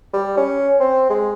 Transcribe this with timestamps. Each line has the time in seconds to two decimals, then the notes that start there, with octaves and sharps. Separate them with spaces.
0.13 G3
0.37 C#4
0.80 C4
1.10 G#3